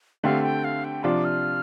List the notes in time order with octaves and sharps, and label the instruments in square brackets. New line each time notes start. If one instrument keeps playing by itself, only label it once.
[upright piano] D3 A3 C4 G4 [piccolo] F5
[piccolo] G5
F5
G5
[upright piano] C3 F3 D4 F4 [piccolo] D6
[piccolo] F6